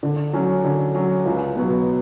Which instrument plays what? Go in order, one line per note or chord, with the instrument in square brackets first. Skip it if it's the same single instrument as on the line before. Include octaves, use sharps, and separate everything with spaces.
[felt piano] D3
F#3 C#4
D3
F#3 C#4
C#2
B2 F#3 B3